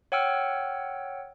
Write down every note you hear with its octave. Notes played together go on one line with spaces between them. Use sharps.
C#5 F#5 G5 E6 F6